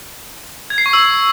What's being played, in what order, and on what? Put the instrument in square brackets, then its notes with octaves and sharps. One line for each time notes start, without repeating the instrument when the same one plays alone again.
[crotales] G#6
C7
C#6
E6